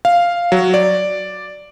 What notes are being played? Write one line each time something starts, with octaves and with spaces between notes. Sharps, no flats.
F5
F#3
D5